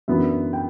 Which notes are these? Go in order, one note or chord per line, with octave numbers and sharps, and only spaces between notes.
F#2 E3 B3 D4 E5
G5